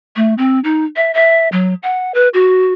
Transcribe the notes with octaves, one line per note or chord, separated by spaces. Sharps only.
A3
C4
D#4
E5
E5
F#3
F#5
B4
F#4